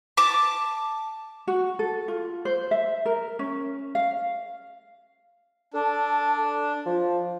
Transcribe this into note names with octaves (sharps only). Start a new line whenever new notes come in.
A5 D6
F#4
A4
F4
C5
E5
A#4
C#4
F5
D4 A4
F3